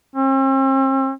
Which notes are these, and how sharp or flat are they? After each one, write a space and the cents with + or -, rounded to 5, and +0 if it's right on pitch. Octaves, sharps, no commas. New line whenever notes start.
C4 +45